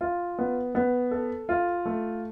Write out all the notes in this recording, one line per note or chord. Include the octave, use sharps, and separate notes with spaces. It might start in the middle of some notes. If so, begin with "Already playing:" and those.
F4
B3
B3
A4
F4
A3